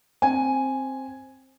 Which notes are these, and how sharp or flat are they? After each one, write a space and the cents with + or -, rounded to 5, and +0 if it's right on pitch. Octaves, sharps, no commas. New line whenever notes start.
C4 +10 G#5 +0